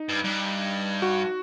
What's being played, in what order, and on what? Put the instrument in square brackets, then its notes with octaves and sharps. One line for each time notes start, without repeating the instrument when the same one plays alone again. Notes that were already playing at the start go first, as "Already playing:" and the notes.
Already playing: [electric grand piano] D#4
[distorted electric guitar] G2
G2
[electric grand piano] F#4